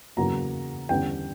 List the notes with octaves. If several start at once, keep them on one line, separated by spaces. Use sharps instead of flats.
E2 C#3 F#3 A#3 A#5
E2 D3 G3 C#4 G5